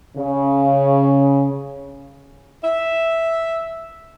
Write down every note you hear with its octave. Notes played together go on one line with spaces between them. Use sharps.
C#3
E5